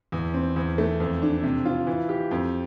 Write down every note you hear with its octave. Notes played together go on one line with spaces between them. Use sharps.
E2
C4
E2
A3
F2
D4
C3
F4
E3
G4
F2